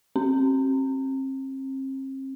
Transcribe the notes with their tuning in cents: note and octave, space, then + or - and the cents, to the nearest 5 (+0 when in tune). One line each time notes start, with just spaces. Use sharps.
C4 +40